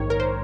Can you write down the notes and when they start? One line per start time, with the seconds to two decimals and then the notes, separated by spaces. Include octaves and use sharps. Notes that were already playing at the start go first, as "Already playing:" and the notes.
Already playing: A#1 G#2 D#3 C#5
0.10 A#4
0.20 C5